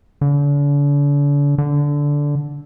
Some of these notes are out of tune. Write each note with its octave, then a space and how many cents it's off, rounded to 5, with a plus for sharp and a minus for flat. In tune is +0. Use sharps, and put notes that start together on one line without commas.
D3 -40
D3 -10